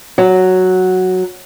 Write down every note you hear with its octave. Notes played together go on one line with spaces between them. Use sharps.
F#3